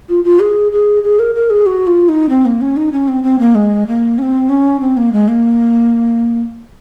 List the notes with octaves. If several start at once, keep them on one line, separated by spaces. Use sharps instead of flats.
F4
F4
G#4
G#4
G#4
A#4
A#4
G#4
F#4
F4
D#4
C4
A#3
C#4
D#4
C#4
C4
C4
A#3
G#3
A#3
C#4
C4
C#4
C4
A#3
G#3
A#3